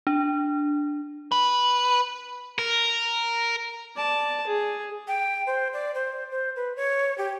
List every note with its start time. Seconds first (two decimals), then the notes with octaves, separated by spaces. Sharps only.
0.07 D4
1.32 B4
2.58 A#4
3.96 D5 A5
4.47 G#4
5.08 G5
5.47 C5
5.73 D5
5.95 C5
6.31 C5
6.56 B4
6.76 C#5
7.18 G4